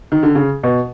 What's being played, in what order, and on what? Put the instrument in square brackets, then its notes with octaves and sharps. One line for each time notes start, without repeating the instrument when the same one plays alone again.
[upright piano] D#3
D3
C#3
B2